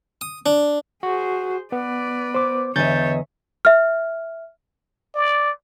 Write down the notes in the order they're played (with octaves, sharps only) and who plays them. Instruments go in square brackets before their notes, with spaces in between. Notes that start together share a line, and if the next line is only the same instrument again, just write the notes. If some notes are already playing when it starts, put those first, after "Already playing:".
[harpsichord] D#6
D4
[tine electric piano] F#4 [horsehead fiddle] G#4 C5
[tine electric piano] B3 [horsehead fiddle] B4 D5
[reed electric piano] C5 D6
[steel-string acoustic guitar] E2 D#5 [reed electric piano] D3 [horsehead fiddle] C#5 E5 [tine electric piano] G6 A6
[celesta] E5 F6
[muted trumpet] D5